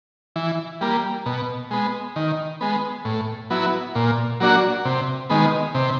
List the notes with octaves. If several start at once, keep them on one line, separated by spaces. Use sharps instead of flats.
E3
G3 A#3
B2
G#3 B3
D#3
G#3 B3
A2
F#3 B3 E4
A#2
F#3 A#3 D4 F#4
C3
D#3 G#3 B3
C3